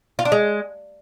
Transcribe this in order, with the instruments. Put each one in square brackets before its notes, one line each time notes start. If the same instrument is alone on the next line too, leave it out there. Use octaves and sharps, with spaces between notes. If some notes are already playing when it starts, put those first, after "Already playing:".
[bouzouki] F4
D4
G#3